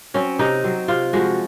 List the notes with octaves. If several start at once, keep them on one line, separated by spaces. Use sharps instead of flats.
F#3 C4 C#4
C3 D#4
F#3 C4
C3 F4
F3 G#3 F#4